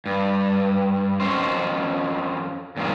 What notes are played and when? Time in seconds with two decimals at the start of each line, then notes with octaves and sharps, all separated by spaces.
0.06 G2
1.20 F2 C#4 C5
2.76 E2 G2 A#2 D#3 G#3